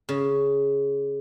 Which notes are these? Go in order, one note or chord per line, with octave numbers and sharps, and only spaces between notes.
C#3